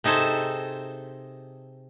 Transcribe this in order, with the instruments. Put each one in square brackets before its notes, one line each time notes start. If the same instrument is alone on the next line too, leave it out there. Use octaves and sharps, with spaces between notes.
[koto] C3 D#4 G#4 A4 C5